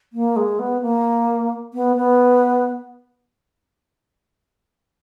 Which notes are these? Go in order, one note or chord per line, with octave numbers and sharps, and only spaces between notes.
A#3
G#3
B3
A#3
B3
B3